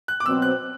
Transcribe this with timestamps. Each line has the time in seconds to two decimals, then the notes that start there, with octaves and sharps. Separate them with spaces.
0.08 F#6
0.20 D6
0.25 B2 F#3 C4 E6
0.42 F#6